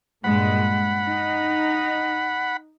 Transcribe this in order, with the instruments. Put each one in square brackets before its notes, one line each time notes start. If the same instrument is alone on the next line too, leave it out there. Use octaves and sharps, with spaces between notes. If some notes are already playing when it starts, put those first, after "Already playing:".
[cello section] G2 A#2 G#3 [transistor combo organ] F#5 B5
[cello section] D#4